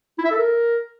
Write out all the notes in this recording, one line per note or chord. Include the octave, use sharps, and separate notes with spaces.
E4
E5
A4
A#4